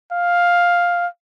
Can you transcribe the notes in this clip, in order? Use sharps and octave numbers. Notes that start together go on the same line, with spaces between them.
F5